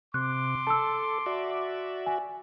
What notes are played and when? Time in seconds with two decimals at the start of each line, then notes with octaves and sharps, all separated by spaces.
0.14 C3 C6 D6 F#6
0.67 A4 A5 E6
1.26 F#4 D5 E5
2.06 G#5